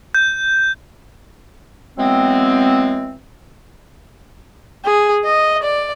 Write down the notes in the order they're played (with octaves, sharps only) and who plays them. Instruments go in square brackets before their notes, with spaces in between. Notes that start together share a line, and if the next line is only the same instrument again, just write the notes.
[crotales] G6
[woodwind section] E3 F#3 G#3 B3 C4
[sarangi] G#4
D#5
D5